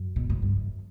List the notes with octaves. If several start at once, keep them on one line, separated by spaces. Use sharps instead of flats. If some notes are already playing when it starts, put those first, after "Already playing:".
Already playing: F#2
B2
A2
G2
F#2